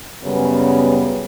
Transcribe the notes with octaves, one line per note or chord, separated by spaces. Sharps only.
F#2 C#3 G3 B3